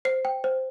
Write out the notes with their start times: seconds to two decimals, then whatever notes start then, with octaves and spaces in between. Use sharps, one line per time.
0.05 C5 C7
0.25 G5
0.44 C5